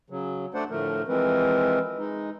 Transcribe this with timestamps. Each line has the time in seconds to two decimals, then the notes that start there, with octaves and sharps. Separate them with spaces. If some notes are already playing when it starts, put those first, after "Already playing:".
0.10 C#3 F#3
0.54 A3 D4 C5 D5 F#5
0.70 A2 D3 F3 A3 A#4
1.08 E3 F3 G#3 C4 A#4 B4
1.99 G#3 D#4